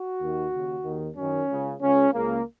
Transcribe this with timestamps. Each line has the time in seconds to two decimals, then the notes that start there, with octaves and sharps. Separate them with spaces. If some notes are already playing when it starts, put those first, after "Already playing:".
Already playing: F#4
0.20 D#2 D#3
0.52 D#2 C#3
0.84 D#2 D#3
1.16 F#2 D#3 C#4
1.48 C#2 C#3
1.81 C#2 C#3 C#4
2.13 C#2 C#3 A#3